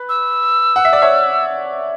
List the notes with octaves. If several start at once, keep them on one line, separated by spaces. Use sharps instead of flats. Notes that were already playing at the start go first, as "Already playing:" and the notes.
Already playing: B4
E6
F#5
E5
D5
C#5 E5